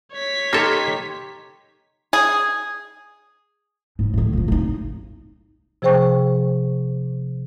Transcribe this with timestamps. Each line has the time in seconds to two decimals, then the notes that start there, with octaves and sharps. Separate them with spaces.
0.13 C#5 B6
0.53 A#3 D#4 G4 A4 C6
2.13 G#4
3.99 G#2 F#3
4.14 A2 D#3
4.33 A#2 F3
4.48 G#1 D#4
5.82 C3 F3 G#4 C5 G5 C#6